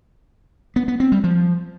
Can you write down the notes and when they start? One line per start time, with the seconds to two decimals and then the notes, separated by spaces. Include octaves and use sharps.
0.76 B3
0.88 B3
1.00 C4
1.12 G3
1.24 F3